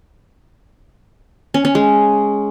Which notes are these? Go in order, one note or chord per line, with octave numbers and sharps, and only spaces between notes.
C#4
C#4
G#3